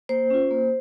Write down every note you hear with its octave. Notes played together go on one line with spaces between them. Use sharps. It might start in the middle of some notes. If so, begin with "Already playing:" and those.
A#3 C5
C#4 F4
A#3